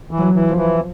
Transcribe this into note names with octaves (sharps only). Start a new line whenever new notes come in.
E3
F#3
E3
F3
E3